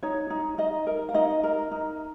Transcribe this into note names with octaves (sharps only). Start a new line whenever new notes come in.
D#4 C#5
D#4
D#4 D#5
A#4
F5
D#4 D#5
A#4
D#4